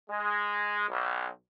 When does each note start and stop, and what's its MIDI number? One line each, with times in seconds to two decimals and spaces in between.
0.10 0.88 56
0.89 1.26 35